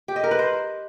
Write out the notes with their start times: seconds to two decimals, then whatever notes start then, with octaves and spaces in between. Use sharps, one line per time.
0.08 G4
0.16 D#5
0.24 A#4
0.31 B4
0.39 C5